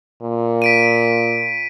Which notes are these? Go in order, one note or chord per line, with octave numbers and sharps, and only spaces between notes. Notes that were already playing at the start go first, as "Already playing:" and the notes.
A#2
B6 D7 D#7